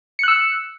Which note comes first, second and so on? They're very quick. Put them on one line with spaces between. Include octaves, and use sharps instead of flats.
C#7 F#6 E6